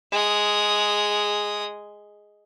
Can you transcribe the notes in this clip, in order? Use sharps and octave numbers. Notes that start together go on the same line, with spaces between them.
G#3 D#6